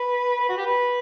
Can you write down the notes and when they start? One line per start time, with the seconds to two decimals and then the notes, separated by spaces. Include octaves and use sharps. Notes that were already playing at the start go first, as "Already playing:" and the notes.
Already playing: B4
0.40 B4
0.49 F#4
0.58 G4
0.66 B4